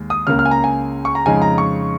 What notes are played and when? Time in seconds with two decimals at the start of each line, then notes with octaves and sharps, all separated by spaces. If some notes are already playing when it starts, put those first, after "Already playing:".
Already playing: D#2 G#3
0.10 D#6
0.27 C#2 C#3 A#3 F6
0.39 F6
0.45 G#5
0.51 A#5
0.64 G#5
1.05 C#6
1.15 A#5
1.25 F2 C#3 G#3 D#4 G#5
1.42 A#5
1.58 C#6